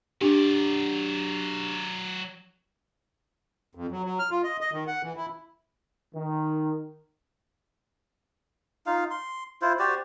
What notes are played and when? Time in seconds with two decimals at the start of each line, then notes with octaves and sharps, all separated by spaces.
0.21 F#3 D4 G4 D5
3.75 F2
3.91 F#3
4.04 F#3
4.19 F6
4.31 F4
4.44 D#5
4.61 D#5
4.72 D#3
4.87 F#5
5.03 E3
5.16 E4
6.15 D#3
8.86 D#4 F4 F5
9.11 C6
9.62 E4 F4 C5
9.79 F#4 G4 C5 D5